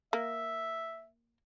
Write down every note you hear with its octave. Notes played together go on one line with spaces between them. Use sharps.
A#3 E5